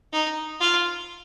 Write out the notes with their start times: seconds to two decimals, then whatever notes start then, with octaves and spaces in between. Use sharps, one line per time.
0.13 D#4
0.60 F4